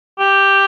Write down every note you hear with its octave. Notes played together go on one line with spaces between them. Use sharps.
G4